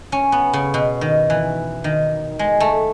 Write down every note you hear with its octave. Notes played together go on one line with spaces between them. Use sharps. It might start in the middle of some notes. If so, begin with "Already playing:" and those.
C#4
B3
C#3
B2
D#3
E3
D#3
G#3
A3